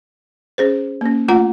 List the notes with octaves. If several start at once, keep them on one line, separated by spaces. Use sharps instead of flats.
C#4 G#4 C5
A#3 C#4
A3 F4 F#5 A#5